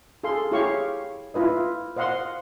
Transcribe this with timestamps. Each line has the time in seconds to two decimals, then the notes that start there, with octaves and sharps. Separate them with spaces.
0.24 G#4 A4 F5 C6
0.51 E4 G4 G#4 C#5 F5 C#6
1.34 E4 F4 B4 D#5
1.96 C5 D#5 F5 F#5 C6